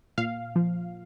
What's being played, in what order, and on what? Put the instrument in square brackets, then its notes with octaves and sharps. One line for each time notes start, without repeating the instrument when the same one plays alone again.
[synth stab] A#2 F5
F3